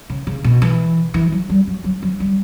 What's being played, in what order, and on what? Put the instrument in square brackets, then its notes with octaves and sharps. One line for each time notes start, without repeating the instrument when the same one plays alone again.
[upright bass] C#3
C#3
B2
E3
E3
F#3
G3
F#3
F#3
F#3
G3